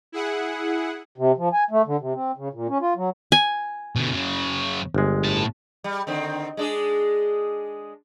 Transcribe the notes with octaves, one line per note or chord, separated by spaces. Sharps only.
E4 G#4 F#5
C3
F3
G#5
A3
D3
C3
C4
C#3
A#2
C#4
F4
F#3
G#5
B2 D3
F#2 C#3
G1 G#3
A2 A5
G3
D3 D#3 C4
G#3 D4 G#4